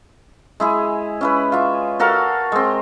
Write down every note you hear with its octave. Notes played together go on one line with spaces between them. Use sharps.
G#3 E4 G#4
C#4 E4 B4
F4 E5
F#4 A4 A#4 F5
G#3 C4